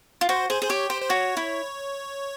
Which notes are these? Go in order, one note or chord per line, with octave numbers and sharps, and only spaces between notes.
F4
F#4 C5
G#4 C5
G#4 C5
G4 C#5
G4 C5
C5
F#4 C#5
E4